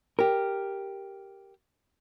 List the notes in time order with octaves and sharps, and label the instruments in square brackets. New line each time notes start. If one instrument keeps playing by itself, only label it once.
[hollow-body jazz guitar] G4 A#4